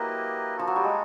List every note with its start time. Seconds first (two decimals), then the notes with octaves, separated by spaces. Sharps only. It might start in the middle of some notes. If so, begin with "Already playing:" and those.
Already playing: F#3 A#3 E4 G4 B4 D#5
0.56 F3 D4 F#4 A4
0.67 F#3
0.76 G3
0.84 G#3